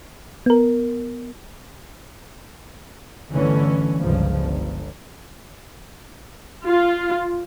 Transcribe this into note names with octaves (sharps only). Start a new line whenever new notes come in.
B3 A#4
G1 D3 E3 A3 C#4
G1 C#2 G2 F3
G1
F4